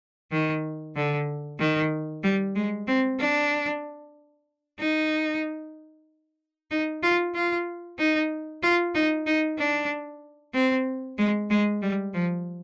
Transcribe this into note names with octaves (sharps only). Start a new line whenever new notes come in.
D#3
D3
D#3
G3
G#3
C4
D4
D#4
D#4
F4
F4
D#4
F4
D#4
D#4
D4
C4
G#3
G#3
G3
F3